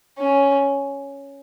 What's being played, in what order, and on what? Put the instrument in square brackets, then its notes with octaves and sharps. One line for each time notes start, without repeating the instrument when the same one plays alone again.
[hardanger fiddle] C#4